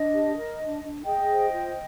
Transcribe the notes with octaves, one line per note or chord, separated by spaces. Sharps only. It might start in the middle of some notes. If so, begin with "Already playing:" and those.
Already playing: D4 D#5
G4
A#4
D4
D4
G#4 D#5 G5
C5
F4